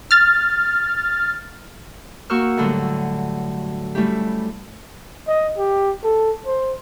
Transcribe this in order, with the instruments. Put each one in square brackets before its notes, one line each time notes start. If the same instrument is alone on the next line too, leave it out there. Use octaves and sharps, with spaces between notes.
[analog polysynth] F6 A6
[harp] A#3 F#4 G5 C#6 E6 F6
A2 D3 F#3 G3
G3 A3 C#4 E4 G4
[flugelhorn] D#5
G4
A4
C5